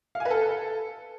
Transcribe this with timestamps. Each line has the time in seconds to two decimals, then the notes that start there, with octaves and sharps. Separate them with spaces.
0.15 F5
0.20 G#5
0.25 B4
0.31 A4